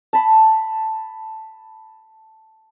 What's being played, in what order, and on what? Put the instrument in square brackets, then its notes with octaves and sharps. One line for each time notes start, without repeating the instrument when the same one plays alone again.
[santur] A5 B5